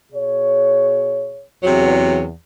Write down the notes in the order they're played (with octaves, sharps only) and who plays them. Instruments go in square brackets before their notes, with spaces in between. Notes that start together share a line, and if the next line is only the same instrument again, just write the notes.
[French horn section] B2 G#4 C#5
[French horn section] E2 [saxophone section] C3 F#3